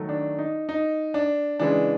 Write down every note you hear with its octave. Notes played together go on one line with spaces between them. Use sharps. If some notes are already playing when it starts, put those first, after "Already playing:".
Already playing: D#3 F#3 A3
D4
D#4
D#4
D4
C#3 E3 G#3 D4